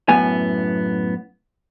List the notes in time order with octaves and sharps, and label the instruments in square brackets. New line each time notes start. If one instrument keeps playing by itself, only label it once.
[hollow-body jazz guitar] F#2 A2 B3 G#5